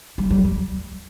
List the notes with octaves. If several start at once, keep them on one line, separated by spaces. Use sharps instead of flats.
G3
G3
G3